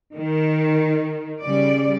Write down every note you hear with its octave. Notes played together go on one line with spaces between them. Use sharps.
D#3
C#3 G3 D5